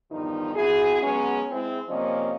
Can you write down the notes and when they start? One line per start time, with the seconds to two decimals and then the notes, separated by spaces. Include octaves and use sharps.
0.12 E2 G2 D#3 F3 D#4
0.56 C4 E4 F#4 G#4
1.03 F#3 G#3 B3 C#4
1.52 G#3 C4 E4
1.89 C3 F3 A#3 C#4 D5 D#5